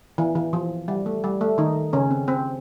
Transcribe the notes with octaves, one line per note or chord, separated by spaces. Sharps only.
E3
E3
F3
G3
A3
G3
A3
D#3 D#4
C#3 C#4
C4
C4